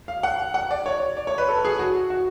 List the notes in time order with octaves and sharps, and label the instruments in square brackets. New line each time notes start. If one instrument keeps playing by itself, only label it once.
[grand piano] F5
F#5
F#5
D5
C#5
D5
C#5
B4
A4
G#4
F#4
F#4